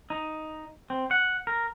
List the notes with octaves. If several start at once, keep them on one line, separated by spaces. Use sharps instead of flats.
D#4
C4
F#5
A#4